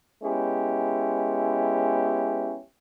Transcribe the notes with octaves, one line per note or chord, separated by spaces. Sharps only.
G#3 B3 C#4 E4 G4